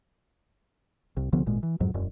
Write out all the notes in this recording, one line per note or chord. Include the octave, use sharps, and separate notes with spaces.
C2
C2 D3 F3 B3
G#1 A#2 G#3
E3
F2 G#2 F#3
E1 F#2